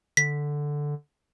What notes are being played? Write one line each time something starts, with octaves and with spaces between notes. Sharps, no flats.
D3 B6